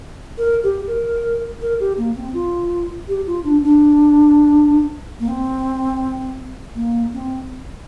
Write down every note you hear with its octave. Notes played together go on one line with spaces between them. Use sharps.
A#4
G4
A#4
A#4
G4
A#3
C4
F4
G4
F4
D4
D4
A#3
C4
A#3
C4